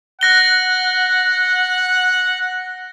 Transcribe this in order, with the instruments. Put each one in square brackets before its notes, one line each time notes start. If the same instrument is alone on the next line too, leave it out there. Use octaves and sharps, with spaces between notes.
[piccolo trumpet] F#5 [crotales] F#6 A#6 G7